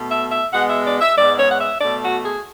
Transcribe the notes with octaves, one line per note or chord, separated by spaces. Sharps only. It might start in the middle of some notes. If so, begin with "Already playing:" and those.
Already playing: B2 A3
E5
E5
B2 G#3 B3 F#5
E5
D5
E5
G#2 G#3 B3 D5
C#5
F#5
E5
B2 A3 D5
F#4
G#4